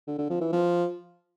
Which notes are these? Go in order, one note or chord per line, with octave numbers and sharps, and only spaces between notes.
D3
D3
F3
E3
F3